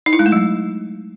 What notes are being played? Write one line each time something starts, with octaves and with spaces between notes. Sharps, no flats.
D#4
E4
G#3
A3
F#3